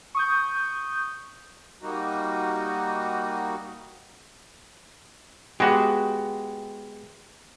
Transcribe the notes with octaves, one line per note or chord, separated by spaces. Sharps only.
C#6 D#6 G6
G3 A#3 D#4 F#4
G#3 B3 F#4 G4